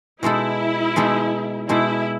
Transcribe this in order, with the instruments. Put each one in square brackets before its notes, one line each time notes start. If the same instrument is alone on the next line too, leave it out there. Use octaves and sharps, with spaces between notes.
[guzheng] B2 G#3 D#4 A4 [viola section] E4
[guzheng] B2 G#3 D#4 A4
[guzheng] B2 G#3 D#4 A4 [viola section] E4